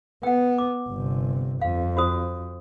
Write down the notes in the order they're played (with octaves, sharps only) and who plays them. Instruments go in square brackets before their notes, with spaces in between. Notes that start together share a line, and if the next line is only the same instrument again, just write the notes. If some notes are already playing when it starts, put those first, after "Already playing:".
[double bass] B3 [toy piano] F#5 G5
[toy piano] D6
[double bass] G1 C3
[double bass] F2 [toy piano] F5
[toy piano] F#4 C5 D#6